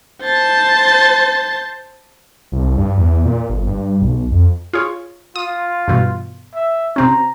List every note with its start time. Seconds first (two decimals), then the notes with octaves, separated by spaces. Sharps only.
0.22 C5 A5
2.52 C2
2.78 G2
2.98 E2
3.25 A#2
3.49 G1
3.67 G2
4.02 B1
4.31 F2
4.73 F4 G#4 C#5
5.36 F4 D#6
5.88 G2 B2 E3
6.55 E5
6.96 C3 C4 C#4 A#5